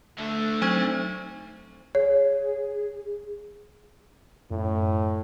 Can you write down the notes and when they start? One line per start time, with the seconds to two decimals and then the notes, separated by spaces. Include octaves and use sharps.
0.18 D3 A3 E5
0.62 F#3 C4 D#4 C5 C#6 G#6
1.95 G#4 C#5
4.51 F#2 A2